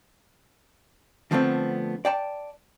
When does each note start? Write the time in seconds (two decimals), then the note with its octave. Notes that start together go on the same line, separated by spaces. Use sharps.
1.31 D3 F3 A3 B3 C4
2.05 D5 G5 A5